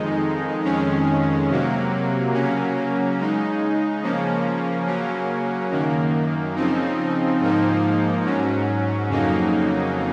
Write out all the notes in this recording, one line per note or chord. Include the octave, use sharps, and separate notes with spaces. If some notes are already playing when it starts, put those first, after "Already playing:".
Already playing: F2 D#3 G#3 D#4
F2 D#3 G#3 C#4
C3 F#3 A#3
C#3 F#3 A#3 C#4
C#3 G#3 D#4
C#3 F3 A#3 C#4
C#3 F#3 A#3 C#4
F#2 D#3 A#3
C#3 F3 C4 D#4
G#2 F3 A#3 D#4
G#2 F#3 C#4
F2 C#3 F#3 A#3 D#4